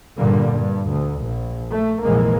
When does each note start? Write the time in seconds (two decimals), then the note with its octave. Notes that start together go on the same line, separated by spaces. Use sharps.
0.18 G2 A#2 D3 G3 A#3
0.50 G2
0.92 D2
1.25 A#1
1.72 A3
2.03 F1 A#1 E3 G#3 A#3